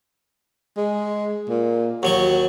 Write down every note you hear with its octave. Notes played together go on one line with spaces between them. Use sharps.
G#3
A#2
D#2 F#3 F#4 C#6